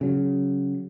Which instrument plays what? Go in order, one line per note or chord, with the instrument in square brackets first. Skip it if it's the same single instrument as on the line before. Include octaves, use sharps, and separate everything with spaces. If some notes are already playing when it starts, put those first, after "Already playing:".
[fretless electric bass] C#3 F#3